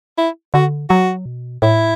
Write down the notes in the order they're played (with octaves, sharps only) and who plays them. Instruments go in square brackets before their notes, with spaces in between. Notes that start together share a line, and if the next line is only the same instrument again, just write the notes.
[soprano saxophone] E4
[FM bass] D3 [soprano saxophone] F#4
[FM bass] F#3 [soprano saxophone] F#4
[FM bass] B2
[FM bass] A2 [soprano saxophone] E4